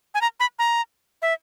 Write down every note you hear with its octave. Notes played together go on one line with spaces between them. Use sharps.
G#5
A#5
B5
A#5
E5